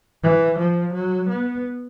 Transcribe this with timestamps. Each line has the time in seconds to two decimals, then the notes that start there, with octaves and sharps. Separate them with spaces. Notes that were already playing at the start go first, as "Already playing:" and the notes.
0.23 E3
0.58 F3
0.93 F#3
1.29 B3